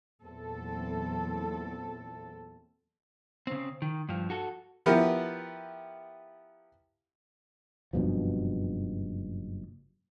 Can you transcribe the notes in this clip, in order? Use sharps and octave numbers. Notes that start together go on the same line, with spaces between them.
E2 A#2 F#3 C4 A4
C#3 C4
D#3
G2 F3
F#4 A4
F3 B3 E4 G4 A#4 B4
F#1 G2 B2 F3